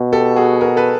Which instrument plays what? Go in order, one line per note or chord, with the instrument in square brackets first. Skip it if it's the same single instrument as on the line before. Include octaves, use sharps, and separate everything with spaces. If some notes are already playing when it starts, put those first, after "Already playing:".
Already playing: [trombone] B2
[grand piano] G4 A4
F#4 G#4
G#4 A#4
A4 B4